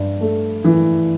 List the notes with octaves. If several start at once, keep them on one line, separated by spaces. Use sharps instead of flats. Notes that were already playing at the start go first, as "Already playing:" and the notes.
Already playing: G2
A3
E3